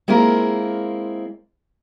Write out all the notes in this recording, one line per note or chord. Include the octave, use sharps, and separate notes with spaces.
G#3 A#3 C4 E4 F4 A#4